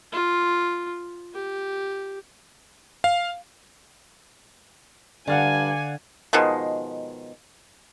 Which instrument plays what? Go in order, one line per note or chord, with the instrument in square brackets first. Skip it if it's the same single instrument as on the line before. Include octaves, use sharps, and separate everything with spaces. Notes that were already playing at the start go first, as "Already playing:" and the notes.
[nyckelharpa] F4
G4
[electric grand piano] F5
[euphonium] G2 [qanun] D3 [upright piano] D5 F5 F#5 [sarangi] G#5
[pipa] B2 D#3 F3 G#3